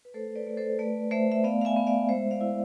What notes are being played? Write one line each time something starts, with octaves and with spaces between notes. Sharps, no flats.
B4
A3 A4 C5
B4 D5
A3
A4 C5
A3 B4 D5
A3 C5 E5
E5
B3 D5 F5
F5
E5 G#5
B3
D5 F5
G#3 C5 E5
D5 F5
E4